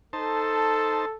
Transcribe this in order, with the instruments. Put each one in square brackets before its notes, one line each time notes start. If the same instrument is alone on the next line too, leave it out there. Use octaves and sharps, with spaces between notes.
[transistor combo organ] D#4 C5 A5 [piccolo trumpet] A4